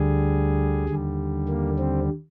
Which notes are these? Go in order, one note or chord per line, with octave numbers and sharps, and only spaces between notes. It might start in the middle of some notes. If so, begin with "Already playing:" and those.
Already playing: D2 D3 G3 G#4
D#2 D3 G3
A#3
C4